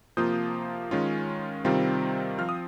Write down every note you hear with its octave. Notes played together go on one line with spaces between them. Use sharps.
C3 F3 A#3 F4 D#6 G6
D#3 G#3 C#4 F4
C3 D#3 G3 C4 F4
F3 C4 F4 F6
D#6